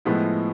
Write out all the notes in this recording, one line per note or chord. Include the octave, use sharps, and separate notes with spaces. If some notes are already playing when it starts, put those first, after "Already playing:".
A2 F3 G#3 B3 E4